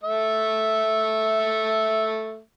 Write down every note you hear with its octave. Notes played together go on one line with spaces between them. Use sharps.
A3 E5